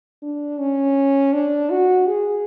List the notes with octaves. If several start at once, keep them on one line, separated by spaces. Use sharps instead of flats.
D4
C#4
D4
F#4
G#4